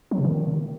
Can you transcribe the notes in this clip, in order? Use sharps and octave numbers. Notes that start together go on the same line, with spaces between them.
F#3
C3
D#3